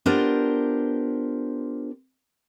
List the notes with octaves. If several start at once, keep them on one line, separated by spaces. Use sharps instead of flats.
B3 D4 F4 G4 A#4 C5